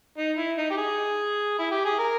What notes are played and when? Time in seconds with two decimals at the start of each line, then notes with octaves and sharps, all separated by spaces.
0.18 D#4
0.38 E4
0.58 D#4
0.71 G4
0.78 G#4
1.59 E4
1.71 G4
1.85 G#4
1.99 A#4